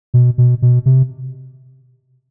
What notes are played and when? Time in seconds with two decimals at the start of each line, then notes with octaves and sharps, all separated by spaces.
0.14 B2
0.38 B2
0.62 B2
0.86 C3